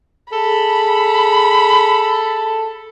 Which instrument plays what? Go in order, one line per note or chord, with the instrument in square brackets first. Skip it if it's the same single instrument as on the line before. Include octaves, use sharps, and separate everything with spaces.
[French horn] G#4 [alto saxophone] A4 [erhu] B5